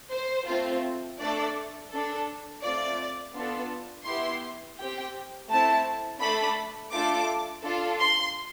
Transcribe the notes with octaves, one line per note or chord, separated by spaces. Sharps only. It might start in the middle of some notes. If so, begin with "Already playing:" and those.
C5
A3 C4 F4
A3 D4 A4 D5
D4 A4
A3 C4 F4 D5
B3 D4 F4 A4
B3 E4 G4 C6
C4 G4 G5
A3 C4 E4 A5
A3 D4 A4 B5
A3 D4 F4 A4 D6
D4 F4 A4
C6